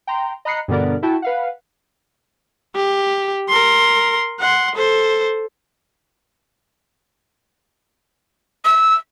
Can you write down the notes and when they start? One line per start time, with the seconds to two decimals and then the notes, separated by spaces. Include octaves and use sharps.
0.07 G5 A#5 C6
0.45 D#5 A#5 B5 F#6 C7 C#7
0.68 G2 B2 D3 B3 A#4 D5
1.03 E4 F#4 G5 A5
1.22 B4 F5 F#5
2.75 G4
3.49 A#4 C6
4.40 F#5 C6
4.76 A4 C5
8.65 E6